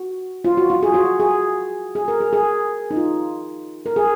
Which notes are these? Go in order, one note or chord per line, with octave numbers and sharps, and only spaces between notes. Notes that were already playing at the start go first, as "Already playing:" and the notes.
Already playing: F#4
F4
F#4
F4
G#4
F#4
G#4
G#4
A#4
G#4
G#4
D#4
F4
A#4
G#4